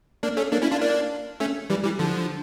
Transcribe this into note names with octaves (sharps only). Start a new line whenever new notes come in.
A#3 D4
A3 C#4
A#3 D4
C#4 E4
D4 F4
A#3 D4
A3 C#4
E3 G3
E3 G3
D3 F3